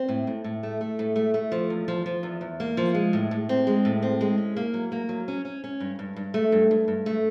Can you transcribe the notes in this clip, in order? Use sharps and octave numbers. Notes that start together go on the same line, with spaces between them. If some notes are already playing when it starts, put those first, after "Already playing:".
Already playing: C4
A2
A2
A2
A3
A3
A2
A3
A3
F3
E2
F3
F3
E2
E2
A#3
F3
G#3
A2
A2
C4
G#3
A2
C4
G#3
C#4
A#3
F#3
A#3
F#3
C#4
C#4
C#4
G2
G2
G2
A3
G2
G2
G2
A3